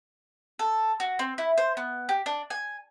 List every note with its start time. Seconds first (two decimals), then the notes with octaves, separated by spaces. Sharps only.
0.59 A4
1.00 F#4
1.19 C4
1.38 E4
1.57 C5
1.77 B3
2.09 G4
2.26 D4
2.50 G#5